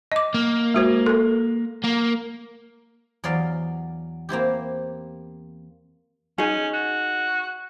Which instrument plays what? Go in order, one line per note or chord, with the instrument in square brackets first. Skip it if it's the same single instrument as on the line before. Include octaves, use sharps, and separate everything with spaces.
[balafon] D#5 D6
[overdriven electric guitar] A#3
[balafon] G#3 F#4 C5
A4 A#4
[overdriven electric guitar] A#3
[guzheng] E2 F#3 D5 F5
A#3 C4 E4 G4
[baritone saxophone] C#4 [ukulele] D#4 G#4
[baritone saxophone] F#4